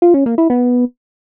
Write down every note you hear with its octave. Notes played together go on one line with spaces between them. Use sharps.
F4
C#4
A#3
E4
B3